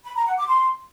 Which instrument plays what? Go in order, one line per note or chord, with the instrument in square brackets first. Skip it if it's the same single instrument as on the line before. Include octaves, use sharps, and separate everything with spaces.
[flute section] B5
A#5
F#5
D6
C6